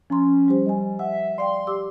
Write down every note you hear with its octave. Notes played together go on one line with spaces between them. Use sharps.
F3 C#4 A#5 C6
G3 G4 C5
G3 D#5 G#5
E5 F#5
D5 F5 G5 C6
G4 D6 E6